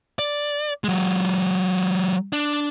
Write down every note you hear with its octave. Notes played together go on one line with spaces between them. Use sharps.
D5
F#3 G#3
D4